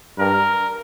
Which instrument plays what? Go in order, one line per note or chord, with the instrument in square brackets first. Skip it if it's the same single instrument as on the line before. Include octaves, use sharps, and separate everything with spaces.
[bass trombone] G2 [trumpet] A#4